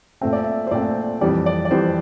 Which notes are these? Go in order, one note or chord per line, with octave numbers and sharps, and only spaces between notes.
A#2 A3 C4 E5
D5
E5
C5
A#2 A3 C4 D5
F2 E3 G3 D5
D5
D5
F2 E3 G3 C5